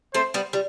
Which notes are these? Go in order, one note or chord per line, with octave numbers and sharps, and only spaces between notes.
A3 C4 C5
G3 B3
G3